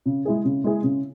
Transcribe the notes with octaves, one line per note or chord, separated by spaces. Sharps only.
C#3
G#3 E4 G#4
C#3
G#3 E4 G#4
C#3